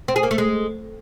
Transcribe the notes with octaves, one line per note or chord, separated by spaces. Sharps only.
C4
G#4
A#3
A3
G#3